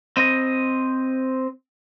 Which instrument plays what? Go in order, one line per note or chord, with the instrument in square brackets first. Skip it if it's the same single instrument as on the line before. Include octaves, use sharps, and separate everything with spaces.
[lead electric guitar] C4 D#5